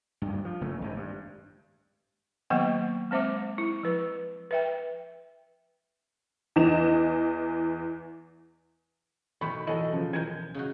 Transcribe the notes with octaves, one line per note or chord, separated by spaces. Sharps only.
D2 G2
F3
F#1 C#3 A3
G#1 G2
G2
D#3 F#3 A#3 B3 F#5 G5
G#3 C4 C5 E5 D6
E4
F3 B4
B4 E5 G5
E2 E3 D#5 E7
B1 B2 D#3 A3 B5 C#6
A1 F#3 C#4 E4 A4 D#5
C#3 F3
C2 G#3 A#4 G6 G#6
C#3 D#4 F#4